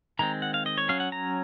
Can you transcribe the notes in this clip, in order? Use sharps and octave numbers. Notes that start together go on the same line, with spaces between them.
D#3 G#3 C4 A#5
F#5
F5
D#5
C#5
F#3 C#4 F5
F#5
A#5